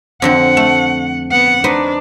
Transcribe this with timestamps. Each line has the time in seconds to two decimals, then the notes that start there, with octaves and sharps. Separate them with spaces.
0.22 F2 D3 C4 F#5
0.57 A3
1.31 B3 F#5
1.64 D4 D#4 B4 C5